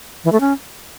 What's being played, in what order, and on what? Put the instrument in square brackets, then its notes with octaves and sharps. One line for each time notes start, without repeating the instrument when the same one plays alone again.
[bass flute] E3
A3
C#4